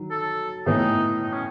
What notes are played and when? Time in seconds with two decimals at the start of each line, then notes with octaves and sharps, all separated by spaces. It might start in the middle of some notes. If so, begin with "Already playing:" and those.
Already playing: D#3 F#3
0.11 A4
0.66 A2 E3 B3 D#4
1.23 D#4
1.33 C#4